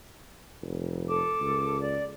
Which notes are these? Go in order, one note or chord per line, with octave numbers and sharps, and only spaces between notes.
F1
A4 A5 D6
C#2
D5